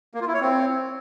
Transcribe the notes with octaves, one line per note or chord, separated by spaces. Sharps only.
A#3
F4
E4
C#5
C4